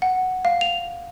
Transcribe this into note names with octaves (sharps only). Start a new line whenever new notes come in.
F#5
F5
F7